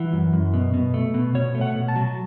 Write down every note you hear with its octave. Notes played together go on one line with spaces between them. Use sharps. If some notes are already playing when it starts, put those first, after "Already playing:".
Already playing: E3 F#5
F#2
F#2
B2
B2
A3
B2
B2 C#5
A3
F#5
B2
A5
F#3